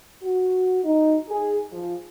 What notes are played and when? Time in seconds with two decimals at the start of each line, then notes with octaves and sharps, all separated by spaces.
0.23 F#4
0.85 D#4
1.29 G#4
1.71 F3